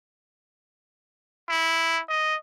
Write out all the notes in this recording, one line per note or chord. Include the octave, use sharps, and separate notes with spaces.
E4
D#5